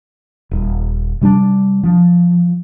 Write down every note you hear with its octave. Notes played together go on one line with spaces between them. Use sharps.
D#1
C3 G3 C4 D4
F3